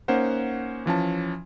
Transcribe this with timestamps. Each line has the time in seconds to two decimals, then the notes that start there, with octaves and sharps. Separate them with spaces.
0.08 A#3 C#4 D#4 C5 F#5
0.86 E3 F3 C#4 A5